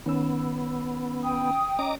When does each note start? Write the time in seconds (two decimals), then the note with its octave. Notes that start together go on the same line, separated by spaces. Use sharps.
0.06 D#3 B3 C#4 E6
1.24 G5 D#6
1.79 C#4 D#5 A#5 D6